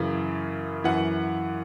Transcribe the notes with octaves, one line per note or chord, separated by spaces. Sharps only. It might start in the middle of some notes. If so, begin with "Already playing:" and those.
Already playing: F#2 C#3 E3
F#2 E3 F#5